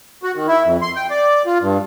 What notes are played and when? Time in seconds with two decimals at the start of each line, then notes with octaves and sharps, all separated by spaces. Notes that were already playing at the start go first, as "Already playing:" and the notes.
0.23 F#4
0.35 D#3
0.47 E4
0.65 F2
0.82 C6
0.96 G5
1.10 D5
1.46 F4
1.61 G2